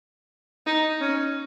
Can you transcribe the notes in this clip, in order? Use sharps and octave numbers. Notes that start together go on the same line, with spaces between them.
D#4
C#4